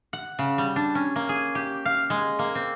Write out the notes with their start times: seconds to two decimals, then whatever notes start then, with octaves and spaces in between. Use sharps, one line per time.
0.13 F#5
0.39 C#3
0.58 G3
0.76 D4
0.95 C#4
1.16 A#3
1.29 G#4
1.55 G4
1.85 F5
2.10 G#3
2.39 A#3
2.55 C4